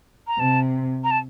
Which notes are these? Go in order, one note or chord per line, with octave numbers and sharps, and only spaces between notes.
A#5
C3 A5
A#5
A5